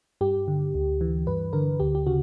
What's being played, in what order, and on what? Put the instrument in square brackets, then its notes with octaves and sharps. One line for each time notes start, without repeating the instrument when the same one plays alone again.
[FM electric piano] G2 G4
D3
D2
E3
G2 B4
D3 A#4
D2 G4
G4
C#3 F#4